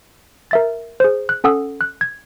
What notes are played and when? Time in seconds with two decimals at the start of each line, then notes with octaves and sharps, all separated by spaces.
0.51 A#4 E5 A6
1.00 G#4 C5
1.29 F#6
1.44 C#4 A4 F#5 D#6 E6
1.81 F#6
2.01 G#6